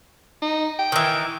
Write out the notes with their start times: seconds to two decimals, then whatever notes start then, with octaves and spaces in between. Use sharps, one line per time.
0.42 D#4
0.79 G5
0.92 D#3 E3